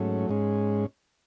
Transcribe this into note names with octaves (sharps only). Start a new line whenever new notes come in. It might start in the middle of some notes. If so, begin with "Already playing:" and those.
Already playing: G#2 F#3 A3 C#4
G#2 G#3 C#4